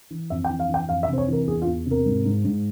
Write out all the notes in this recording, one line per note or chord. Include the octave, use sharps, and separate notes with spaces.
E3
F2 E5
G5
E3
F5
E3 G5
F2 F5
E5
C3 C5
C#5
E3 A#4
E2 G#4
F4
E2
C3
A#4
G#2
G#2
G#2